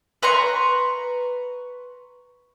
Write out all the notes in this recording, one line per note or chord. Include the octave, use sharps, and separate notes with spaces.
B4 A#5 C6 C#6